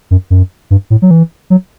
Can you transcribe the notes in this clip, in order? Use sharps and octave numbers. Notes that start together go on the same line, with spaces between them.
F#2
F#2
G2
A2
F#3
E3
F#3